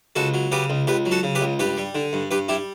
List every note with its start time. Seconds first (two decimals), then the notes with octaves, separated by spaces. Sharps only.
0.16 C#2 F#4 A4
0.34 F#3
0.52 C#3 G4 B4
0.70 C#2
0.87 C#2 G4 B4
1.05 F#3
1.11 F#4 A4
1.23 C#3
1.35 G4 B4
1.41 C#2
1.59 G2 G4 B4
1.77 G3
1.95 D3
2.13 G2
2.31 G2 G4 B4
2.49 G3 E4 G4